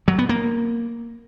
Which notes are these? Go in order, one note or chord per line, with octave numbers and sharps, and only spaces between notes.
F#3
B3
A#3